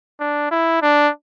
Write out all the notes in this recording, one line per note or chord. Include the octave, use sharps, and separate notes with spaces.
D4
E4
D4